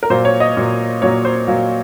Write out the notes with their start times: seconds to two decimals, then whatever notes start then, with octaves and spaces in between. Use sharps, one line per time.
0.03 A#4
0.10 A#2 F#3 A#3 C5
0.25 C#5
0.40 D#5
0.56 A#2 F#3 A#3
1.02 A#2 F#3 A#3 C#5
1.25 C5
1.48 A#2 F#3 A#3